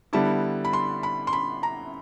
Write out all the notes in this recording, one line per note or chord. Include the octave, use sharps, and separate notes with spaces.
D3 G3 B3 E4 A5
B5
C6
B5
C6
B5
A#5